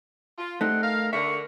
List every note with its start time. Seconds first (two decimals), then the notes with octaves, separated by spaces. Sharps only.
0.39 F4
0.61 C#3 G3 A3 C4 D#4 F#5
0.82 A#4 F5
1.13 D3 A#4 E5 C#6